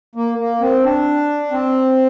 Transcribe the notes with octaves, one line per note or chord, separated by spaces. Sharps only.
A#3
A#3
C4
D4
C4